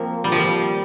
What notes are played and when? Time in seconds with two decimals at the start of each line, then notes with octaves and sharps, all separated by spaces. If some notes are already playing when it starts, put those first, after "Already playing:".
Already playing: F3 A#3 C4
0.24 G3
0.32 F3
0.40 G3